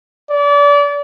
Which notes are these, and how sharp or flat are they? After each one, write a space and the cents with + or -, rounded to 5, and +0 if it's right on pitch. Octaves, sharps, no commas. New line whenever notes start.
D5 -30